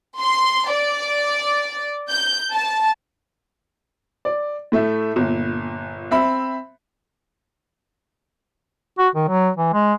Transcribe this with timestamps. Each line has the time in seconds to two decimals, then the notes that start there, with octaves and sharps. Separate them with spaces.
0.20 C6
0.70 D5
2.09 G6
2.52 A5
4.25 D5
4.72 A2 A3 E5
5.16 G1 A#2
6.11 C4 E5 B5
8.99 F#4
9.15 D#3
9.28 F#3
9.57 E3
9.73 G#3